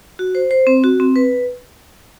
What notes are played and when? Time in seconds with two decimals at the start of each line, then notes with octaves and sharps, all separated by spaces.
0.19 F#4
0.35 C5
0.51 C5
0.67 C4
0.84 F#4
1.00 C4
1.16 B4